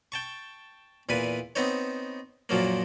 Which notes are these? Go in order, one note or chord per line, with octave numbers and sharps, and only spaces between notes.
G5 A5 C#6
E2 A#2 B4 G#5
B3 C4 D#4 C#5
F#2 A#2 F3 F#3 A#3